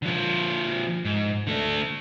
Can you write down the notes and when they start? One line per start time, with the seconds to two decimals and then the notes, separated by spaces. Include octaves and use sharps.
0.02 D3 F3
1.05 G#2
1.47 D3 A3